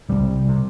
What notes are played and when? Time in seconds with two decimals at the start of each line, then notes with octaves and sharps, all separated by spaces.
0.09 C2 C3 G3
0.49 C3